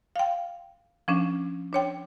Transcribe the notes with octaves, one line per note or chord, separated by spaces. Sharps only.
F5 G5
F3 C#4 D4
D4 C#5 G5